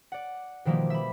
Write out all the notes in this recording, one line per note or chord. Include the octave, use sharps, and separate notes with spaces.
D5 F#5
B2 D#3 F3 G3 A#3
E5 B5